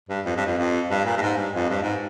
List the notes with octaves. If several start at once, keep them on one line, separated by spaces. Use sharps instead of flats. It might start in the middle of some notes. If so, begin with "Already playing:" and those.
G2
F2
G2
F2
F2
G2
A#2
G2
G#2
G2
F2
G2
G#2